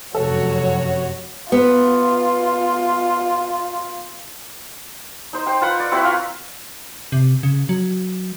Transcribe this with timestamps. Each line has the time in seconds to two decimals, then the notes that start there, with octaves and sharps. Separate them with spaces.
0.15 F1 F#2 F#4 A4 C#5
1.52 B3 F4
5.33 D#4 C5
5.46 C5 G5
5.61 F4 B4 F#5
5.80 D5
5.91 C4 E4 F#4 B4
6.03 F4 A#4 F5
7.12 C3
7.43 C#3
7.69 F#3